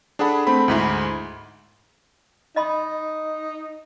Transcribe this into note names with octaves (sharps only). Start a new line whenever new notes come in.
D4 G#4 A4 F#5 B5
A3 C4 B5
D2 G#2 E4
D#4 D#5 B5 C6